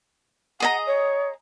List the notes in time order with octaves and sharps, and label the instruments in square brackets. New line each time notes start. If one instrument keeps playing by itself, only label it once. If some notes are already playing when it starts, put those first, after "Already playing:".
[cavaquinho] G#4 D#5 A#5 [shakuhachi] F#5
[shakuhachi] C#5